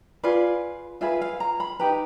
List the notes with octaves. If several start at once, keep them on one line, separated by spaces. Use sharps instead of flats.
F4 G#4 B4 D5
F4 G#4 B4 E5
F5
A#5
B5
D#4 G4 B4 A#5